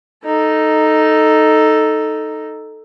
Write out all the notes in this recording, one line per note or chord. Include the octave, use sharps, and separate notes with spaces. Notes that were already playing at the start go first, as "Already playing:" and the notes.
D#4 A4